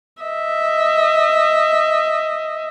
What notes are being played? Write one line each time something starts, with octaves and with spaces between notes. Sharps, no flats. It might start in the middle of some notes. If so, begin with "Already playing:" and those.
D#5 E5